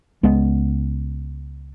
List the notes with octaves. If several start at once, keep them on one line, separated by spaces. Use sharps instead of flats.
C#2 G#3 B3